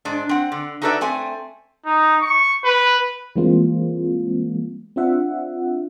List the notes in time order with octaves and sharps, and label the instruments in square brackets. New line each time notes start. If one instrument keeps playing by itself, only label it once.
[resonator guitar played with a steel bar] G#2 D4
C4 F#5
D3
D#4 F#4 A4 B4 D5 E5
A3 C4 G#5
[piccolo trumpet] D#4
C#6
B4
[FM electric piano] E3 G3 G#3 A#3 C4 F4
C4 D4 F4 E5 F#5